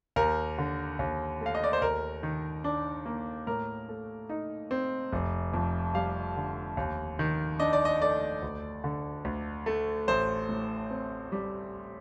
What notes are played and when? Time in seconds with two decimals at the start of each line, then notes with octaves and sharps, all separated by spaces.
0.16 D#2 A#4
0.58 D3
0.99 D#2
1.41 A3 F5
1.55 D#5
1.64 D5
1.73 C5
1.82 D#2 A#4
2.23 D#3
2.64 D4
3.06 A#3
3.47 A2 A#4
3.89 A3
4.29 D#4
4.71 C4
5.12 F1
5.53 F2
5.95 G3 F5
6.36 D3
6.77 D#2
7.19 D#3
7.60 D4 D#5
7.73 D5
7.85 D#5
8.01 A3 D5
8.42 D2
8.84 D3
9.25 D2
9.66 A3
10.08 A1 C5
10.49 A2
10.90 C4
11.32 G3